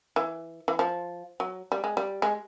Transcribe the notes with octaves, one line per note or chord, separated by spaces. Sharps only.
E3
E3
F3
F#3
G3
G#3
G3
G#3